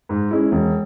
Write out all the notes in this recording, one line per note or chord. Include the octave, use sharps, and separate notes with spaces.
G#2
G#3 C#4 E4
E1